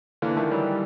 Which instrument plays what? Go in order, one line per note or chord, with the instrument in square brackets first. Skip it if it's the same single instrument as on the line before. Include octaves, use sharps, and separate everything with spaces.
[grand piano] D3 E3 [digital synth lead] A#3
[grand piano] D#3 F3 [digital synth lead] A3
[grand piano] E3 F#3 [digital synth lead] G3